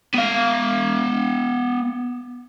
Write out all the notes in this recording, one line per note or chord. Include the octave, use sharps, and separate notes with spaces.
B3 F5